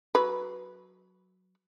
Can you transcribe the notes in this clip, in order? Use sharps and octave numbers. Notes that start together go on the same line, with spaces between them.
F#3 B4